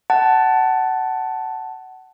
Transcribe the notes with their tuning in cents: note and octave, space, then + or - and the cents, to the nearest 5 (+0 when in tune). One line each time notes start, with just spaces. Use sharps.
F#5 +20 A5 +0